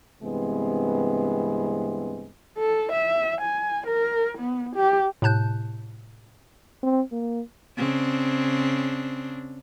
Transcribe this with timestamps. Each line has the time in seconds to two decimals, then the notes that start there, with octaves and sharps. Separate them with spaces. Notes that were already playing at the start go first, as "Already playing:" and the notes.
0.22 G2 C3 E3 G#3 B3 C4
2.58 A4
2.92 E5
3.41 G#5
3.87 A#4
4.38 B3
4.76 G4
5.22 A2 C3 A5 F#6 G6
6.83 C4
7.12 A#3
7.77 C#3 C4 D4